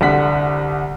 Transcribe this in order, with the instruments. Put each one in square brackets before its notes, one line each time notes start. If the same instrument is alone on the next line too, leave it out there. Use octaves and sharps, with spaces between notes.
[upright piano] C2 D3 F#5 B6